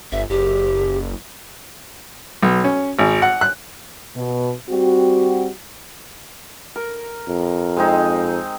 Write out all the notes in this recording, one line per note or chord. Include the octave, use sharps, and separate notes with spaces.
G1 E5
F#1 G4
B1
C#4
G#1
F#5
F#6
B2
G3 C4 F#4
A#4
F2
G#3 C4 D#4